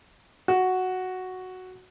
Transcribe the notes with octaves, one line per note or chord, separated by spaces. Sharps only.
F#4